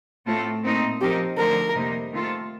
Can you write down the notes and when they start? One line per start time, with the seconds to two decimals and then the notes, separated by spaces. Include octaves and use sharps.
0.26 A2 A3 C4 F4 A4
0.63 A#2 A3 C4 D#4
1.00 F3 C4 D#4 G4 A#4
1.37 D3 F3 A3 D#4 A#4
1.74 F2 C3 G3 A#3 D#4
2.12 D#3 A3 C4 F4 A4